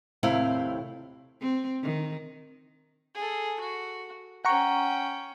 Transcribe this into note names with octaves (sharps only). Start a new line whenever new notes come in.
D#2 A2 C3 C4 E4 F5
C4
D#3
G#4 A4
F#4
C#4 F#5 G5 A#5 C#6